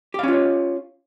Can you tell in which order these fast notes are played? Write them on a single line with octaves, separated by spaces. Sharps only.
G4 F5 C#4 F4 C#5